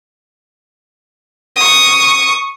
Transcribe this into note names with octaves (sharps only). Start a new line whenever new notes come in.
C#6 D#6